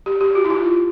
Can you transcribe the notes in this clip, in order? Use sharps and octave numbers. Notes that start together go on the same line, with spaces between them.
G4
G4
F#4
E4
F4